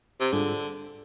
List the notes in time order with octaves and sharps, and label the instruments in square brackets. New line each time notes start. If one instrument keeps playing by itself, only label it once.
[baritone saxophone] C3
[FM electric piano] G#2 G3 D4 F4 G#4 [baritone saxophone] D3